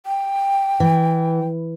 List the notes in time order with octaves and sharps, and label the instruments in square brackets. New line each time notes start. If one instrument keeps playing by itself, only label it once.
[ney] G5
[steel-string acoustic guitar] E3